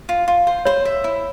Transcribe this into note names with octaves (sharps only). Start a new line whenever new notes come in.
F4
F4
C5
C5 C#5
E5
E4